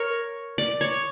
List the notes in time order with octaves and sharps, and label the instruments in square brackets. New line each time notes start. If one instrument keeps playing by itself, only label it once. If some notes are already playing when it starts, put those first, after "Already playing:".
Already playing: [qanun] A#4 C#5
D5
C#5